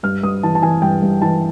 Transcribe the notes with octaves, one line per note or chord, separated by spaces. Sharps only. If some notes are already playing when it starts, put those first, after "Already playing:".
G2 F6
G2 D#6
E3 A5
A5
E3 G#5
G2 G5
G2
E3 A5